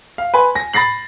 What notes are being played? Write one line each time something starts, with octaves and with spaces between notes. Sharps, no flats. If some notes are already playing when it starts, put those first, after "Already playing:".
F5
B4 G#5 C6
G#5 A#6
B5 A6 A#6 C7 F#7